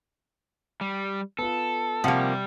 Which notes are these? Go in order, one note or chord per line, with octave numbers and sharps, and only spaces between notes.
G3
B3 F4 A4
C3 F3 G3 A#3 F#5 C#7